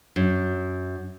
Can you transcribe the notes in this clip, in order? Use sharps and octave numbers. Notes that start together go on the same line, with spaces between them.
F#2